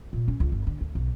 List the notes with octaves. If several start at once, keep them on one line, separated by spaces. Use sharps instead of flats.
A#2
C#4
C#2
G1
D3
D2
B1